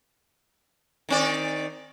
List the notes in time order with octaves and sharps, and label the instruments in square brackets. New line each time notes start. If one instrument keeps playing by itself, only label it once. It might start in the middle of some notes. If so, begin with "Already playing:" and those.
[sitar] D#3 C4 D5